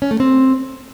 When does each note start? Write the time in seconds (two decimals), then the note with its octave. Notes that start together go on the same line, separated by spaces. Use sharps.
0.02 C#4
0.11 A3
0.20 C4